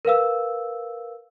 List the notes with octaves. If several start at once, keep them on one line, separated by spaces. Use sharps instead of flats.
A#4 B4 F5 E6